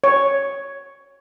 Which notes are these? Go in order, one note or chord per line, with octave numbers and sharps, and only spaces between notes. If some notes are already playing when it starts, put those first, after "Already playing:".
C#5